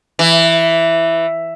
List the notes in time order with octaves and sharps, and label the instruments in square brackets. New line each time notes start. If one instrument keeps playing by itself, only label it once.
[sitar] E3